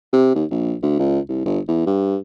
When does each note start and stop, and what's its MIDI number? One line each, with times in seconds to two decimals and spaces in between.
0.13 0.31 48
0.35 0.45 39
0.51 0.74 34
0.82 0.97 38
0.99 1.19 37
1.29 1.43 36
1.45 1.59 31
1.68 1.82 40
1.86 2.17 43